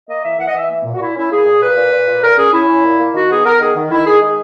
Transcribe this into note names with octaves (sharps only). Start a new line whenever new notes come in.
A#3 D#5
E3 E5
E3 F#5
D#5
E3 E5
A#3
A#2
F#4
A#2 E4
C#4 E4
A#3 G#4
A#2
A#2 B4
A#2
A#2
A#2
A#2 A#4
C#4 G#4
C#4 E4
C#4
A#2
A#3
D#3 F#4
B3 G#4
B3 A#4
D#3 G#4
D#3
D#3 E4
D#3 G#4
G#3 G#4